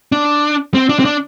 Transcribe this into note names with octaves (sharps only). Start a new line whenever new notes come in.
D4
C4
D4
C4
D4